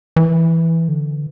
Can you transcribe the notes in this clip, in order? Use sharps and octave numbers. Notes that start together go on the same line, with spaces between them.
E3
D3